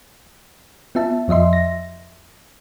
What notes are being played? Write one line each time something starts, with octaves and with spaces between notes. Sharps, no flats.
B3 F4 E5 A5
F2 F3 D#5 E5 C6
A#6